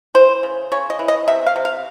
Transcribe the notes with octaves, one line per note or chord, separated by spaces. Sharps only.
E3 C5
C#3
C#3 C#5
D#5
E3
D#5
C3 E5
F5
C3
F5